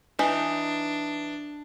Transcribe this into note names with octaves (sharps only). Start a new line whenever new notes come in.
E3 D4 D#4